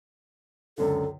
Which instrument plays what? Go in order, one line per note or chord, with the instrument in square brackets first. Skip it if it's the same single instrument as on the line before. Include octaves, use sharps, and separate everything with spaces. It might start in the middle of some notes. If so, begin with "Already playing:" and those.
[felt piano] C#2 F#2 D3 [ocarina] A4